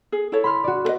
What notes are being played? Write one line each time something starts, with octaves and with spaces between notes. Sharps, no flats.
G#4
E4 A4 C#5
B5 C6 F6
F#4 D5
A4 B4 D#5